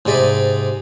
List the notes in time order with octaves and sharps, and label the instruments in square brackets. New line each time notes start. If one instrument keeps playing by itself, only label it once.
[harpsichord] G#2 C3 D5 D#5 B5